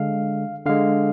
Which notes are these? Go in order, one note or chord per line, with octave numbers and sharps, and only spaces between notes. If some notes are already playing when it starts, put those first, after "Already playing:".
Already playing: D3 G#3 F5
D3 G#3 F5